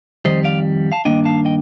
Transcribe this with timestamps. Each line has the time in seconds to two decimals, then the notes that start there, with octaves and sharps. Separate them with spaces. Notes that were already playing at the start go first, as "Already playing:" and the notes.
0.25 F2 D#3 G3 C5 D#5
0.44 D5 F5
0.92 F5 A5
1.05 G2 D#3 A#3 D4 D#5 G5
1.25 F5 A5
1.45 D#5 G5